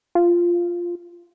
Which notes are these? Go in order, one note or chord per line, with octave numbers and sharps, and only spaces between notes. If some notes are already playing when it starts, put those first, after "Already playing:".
F4